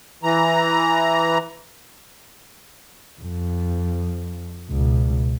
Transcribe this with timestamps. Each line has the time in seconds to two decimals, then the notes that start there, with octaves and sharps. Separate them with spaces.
0.23 E3 A#5
3.21 F2
4.70 C#2 B2